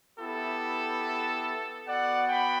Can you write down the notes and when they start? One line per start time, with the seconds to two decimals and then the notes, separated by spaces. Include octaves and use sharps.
0.18 B3 E4 G4 A4
1.86 B3 F#4 D5 F#5
2.28 G5 B5